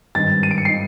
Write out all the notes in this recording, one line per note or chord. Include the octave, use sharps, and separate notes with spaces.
G#1 G2 D#3 A6
D#7
D7
C#7
D#3 C7